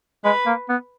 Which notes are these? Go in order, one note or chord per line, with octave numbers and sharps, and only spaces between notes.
G#3 B4
A#3
B3